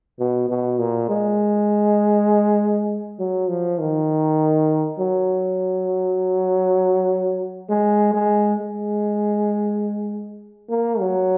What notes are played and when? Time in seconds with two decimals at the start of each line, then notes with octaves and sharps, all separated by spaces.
0.19 B2
0.49 B2
0.79 A#2
1.10 G#3
3.19 F#3
3.49 F3
3.79 D#3
4.99 F#3
7.70 G#3
8.14 G#3
8.60 G#3
10.70 A#3
11.00 F#3